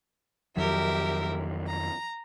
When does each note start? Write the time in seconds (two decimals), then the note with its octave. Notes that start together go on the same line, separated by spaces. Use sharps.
0.57 F2 D#3 F#3 G4 A#4 E5
1.66 A#5